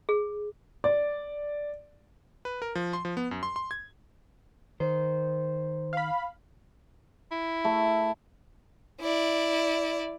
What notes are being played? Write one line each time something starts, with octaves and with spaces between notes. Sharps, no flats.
G#4
D5
B4
A#4
F3
C6
F3
B3
F#2
C6
C6
G#6
D#3 C5
F5 B5
E4
A3
E4 D5